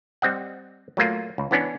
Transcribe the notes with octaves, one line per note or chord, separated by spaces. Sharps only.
G3 C4 D#5 F#5
F#3 A3 A#3 F4
C#2
E3 B3 C#4 D4